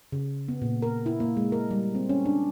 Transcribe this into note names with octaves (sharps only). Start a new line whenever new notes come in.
C#3
B3
A#2
A#4
E4
A#3
G#3
A#4
G3
C4
C#4
D4